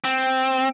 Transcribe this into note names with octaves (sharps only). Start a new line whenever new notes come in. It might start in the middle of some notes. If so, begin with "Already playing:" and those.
C4